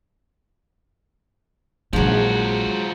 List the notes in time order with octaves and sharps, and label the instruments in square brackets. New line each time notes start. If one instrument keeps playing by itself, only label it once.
[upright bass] A#1 D#3 [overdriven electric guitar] F3 F#4 [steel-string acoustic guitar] F#3 G#3